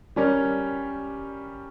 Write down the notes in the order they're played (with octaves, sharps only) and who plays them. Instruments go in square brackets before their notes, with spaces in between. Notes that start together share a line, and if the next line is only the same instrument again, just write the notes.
[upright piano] G3 C#4 G4 A#4